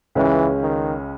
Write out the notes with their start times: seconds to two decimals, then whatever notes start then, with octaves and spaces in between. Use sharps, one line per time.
0.15 C#2 C#3 E3 G#3 C#4
0.61 D#3